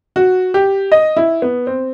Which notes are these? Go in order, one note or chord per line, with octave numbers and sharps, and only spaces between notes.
F#4
G4
D#5
E4
B3
C4